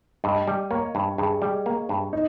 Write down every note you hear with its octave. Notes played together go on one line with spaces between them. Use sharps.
G2 D#5
G3
A#3 C#5
G2
G2 G#4
G3
A#3
G2
D#4